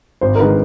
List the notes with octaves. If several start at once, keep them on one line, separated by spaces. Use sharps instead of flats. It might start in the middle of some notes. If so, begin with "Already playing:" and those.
G#1 C5
A#4
D#3 G#3 B4